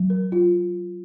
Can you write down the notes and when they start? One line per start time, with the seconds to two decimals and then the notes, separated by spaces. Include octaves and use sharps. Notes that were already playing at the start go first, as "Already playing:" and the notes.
Already playing: F#3
0.10 A#4
0.32 F4